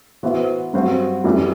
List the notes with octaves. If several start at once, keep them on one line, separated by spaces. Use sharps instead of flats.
E3 B3 F#4 C5 E5
G2 F#3 C4 F#4
F#2 E3 G3